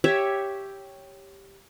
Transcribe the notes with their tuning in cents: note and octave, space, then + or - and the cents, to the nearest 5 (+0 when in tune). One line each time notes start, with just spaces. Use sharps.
G4 +0 C#5 +0 E5 +0